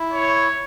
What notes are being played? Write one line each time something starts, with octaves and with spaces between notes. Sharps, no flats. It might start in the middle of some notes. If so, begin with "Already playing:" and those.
Already playing: E4
C#5